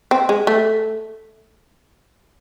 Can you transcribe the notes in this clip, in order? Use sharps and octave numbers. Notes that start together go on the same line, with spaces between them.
C4
G#3
A3